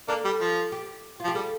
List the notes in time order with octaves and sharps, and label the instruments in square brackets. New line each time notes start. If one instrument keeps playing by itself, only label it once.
[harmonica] A#3 D4 [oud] A4
[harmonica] G3
F3
[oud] G4
F4
[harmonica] F3
[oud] G4
[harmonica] G3 [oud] A4